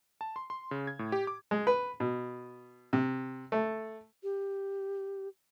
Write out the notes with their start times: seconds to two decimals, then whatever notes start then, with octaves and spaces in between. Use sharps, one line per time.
0.21 A5
0.36 C6
0.50 C6
0.71 C#3
0.87 G#6
0.99 A2
1.12 G4
1.27 D6
1.51 G#3
1.67 B4
2.00 B2
2.93 C3
3.52 A3
4.23 G4